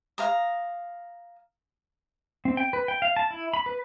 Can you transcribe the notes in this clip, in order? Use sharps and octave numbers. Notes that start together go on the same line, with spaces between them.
F5 A#5 D#6
C4
G5
B4
G5
F5
A5
E4
B5
B4